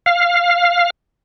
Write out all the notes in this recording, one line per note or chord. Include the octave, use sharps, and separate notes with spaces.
F5